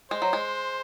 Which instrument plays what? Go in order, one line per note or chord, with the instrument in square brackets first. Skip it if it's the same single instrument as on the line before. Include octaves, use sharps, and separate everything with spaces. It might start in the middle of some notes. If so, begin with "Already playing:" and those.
[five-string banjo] G#3 [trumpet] C5
[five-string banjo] F#3
G#3